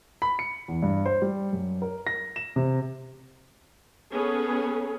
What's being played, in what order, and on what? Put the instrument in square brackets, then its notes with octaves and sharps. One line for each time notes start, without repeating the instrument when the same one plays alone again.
[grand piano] B5
C#7
E2
G2
C5
G3
F#2
A#4
A#6
E7
C3
[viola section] B3 C#4 G#4 A4